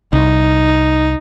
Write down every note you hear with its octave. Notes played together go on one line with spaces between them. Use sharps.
C2 D#4